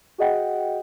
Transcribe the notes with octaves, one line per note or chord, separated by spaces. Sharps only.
F#4 G#4 D#5 F#5 G5